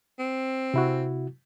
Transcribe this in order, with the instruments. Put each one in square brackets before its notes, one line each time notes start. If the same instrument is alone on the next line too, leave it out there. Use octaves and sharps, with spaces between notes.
[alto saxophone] C4
[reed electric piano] C3 E4 F#4